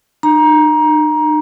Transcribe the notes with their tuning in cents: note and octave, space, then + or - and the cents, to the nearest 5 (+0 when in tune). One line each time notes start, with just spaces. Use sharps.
D#4 -45 A#5 +20